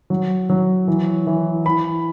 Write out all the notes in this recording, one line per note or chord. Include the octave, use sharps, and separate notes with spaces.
F#3
F#3
E3
E3
E3 B5